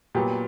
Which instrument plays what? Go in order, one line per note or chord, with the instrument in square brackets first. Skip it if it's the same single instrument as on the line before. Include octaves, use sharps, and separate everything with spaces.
[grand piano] A#2 F#3 B3 G4